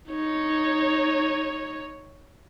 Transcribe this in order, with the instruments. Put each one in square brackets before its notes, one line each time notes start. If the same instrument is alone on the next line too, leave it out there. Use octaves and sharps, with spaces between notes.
[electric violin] D#4 C#5